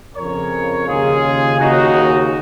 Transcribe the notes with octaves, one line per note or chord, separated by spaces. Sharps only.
F2 C#3 A#4 C#5
D#2 C#3 F4 G#4
D#2 C#3 D#4 F#4